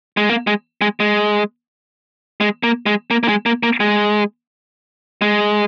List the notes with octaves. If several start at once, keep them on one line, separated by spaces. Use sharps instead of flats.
G#3
A#3
G#3
G#3
G#3
G#3
A#3
G#3
A#3
A#3
G#3
A#3
A#3
G#3
G#3